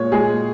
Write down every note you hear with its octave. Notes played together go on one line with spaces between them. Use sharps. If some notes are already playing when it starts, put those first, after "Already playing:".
Already playing: A#2 G#3 C#5
G#3 G#4